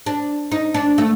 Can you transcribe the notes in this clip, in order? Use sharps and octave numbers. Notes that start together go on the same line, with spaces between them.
D4
D#4
D4
A3